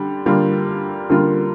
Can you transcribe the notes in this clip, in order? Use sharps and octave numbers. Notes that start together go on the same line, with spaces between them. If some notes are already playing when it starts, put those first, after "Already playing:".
Already playing: D3 G3
D3 G3 A#3 F4
D3 G3 A#3 F4